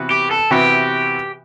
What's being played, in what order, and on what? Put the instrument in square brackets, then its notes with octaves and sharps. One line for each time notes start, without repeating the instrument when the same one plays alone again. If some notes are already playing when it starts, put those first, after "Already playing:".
Already playing: [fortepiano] C3 E3 B3 F#4 B4
[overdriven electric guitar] G4
A4
[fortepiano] C3 E3 B3 F#4 B4 [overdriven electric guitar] G4